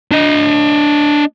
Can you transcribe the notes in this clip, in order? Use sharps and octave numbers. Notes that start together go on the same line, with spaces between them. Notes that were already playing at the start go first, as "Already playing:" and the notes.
D4 D#5